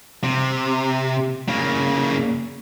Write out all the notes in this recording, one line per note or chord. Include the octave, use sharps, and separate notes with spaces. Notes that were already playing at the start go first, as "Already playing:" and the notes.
C3
C#3 A#3